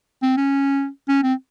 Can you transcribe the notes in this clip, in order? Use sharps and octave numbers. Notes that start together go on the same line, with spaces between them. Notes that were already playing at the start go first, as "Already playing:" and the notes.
C4
C#4
C#4
C4